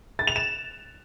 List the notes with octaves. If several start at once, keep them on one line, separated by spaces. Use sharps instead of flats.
A6
F7
E7